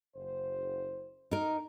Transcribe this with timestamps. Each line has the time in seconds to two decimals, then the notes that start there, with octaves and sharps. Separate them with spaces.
0.16 F#1 C5
1.31 D#4 A#4